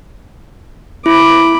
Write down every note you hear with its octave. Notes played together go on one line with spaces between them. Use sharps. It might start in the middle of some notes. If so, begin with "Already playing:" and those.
E4 B5 D6